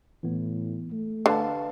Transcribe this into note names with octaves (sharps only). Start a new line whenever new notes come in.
A2 E3 B3
A3
D3 B4 F5 A5